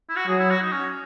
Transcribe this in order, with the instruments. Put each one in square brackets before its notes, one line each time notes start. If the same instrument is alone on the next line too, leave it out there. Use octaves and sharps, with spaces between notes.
[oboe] E4
F#4
[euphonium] F#3 [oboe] G#4
[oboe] E4
F#4
D#4
C#4